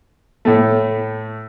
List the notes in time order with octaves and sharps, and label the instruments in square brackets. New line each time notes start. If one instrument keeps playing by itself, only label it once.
[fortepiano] A2 A3